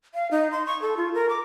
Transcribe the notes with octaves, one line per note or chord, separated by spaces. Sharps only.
F5
D#4
C6
C#6
A4
F4
A#4
D6